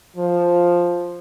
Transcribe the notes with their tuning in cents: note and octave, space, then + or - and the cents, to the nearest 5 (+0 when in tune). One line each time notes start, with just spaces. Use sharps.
F3 +0